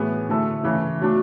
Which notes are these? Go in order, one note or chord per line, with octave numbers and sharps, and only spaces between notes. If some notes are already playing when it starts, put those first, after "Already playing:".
Already playing: A2 E3 B3 E4 G#4
D3 A3 E4 A4
C#3 E3 A3
B2 F#3 A3 D4